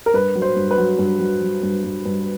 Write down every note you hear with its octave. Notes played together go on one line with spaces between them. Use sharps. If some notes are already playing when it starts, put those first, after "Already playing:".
A#4
G2 B4
F#3
C5
G2
B4
F#3
G2
F#3
F#3
G2
G2
G2